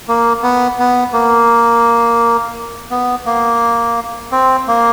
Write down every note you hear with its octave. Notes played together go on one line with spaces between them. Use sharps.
A#3
B3
B3
A#3
B3
A#3
C4
A#3